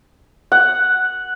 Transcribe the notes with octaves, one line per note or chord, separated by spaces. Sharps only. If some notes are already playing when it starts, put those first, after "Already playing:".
F#5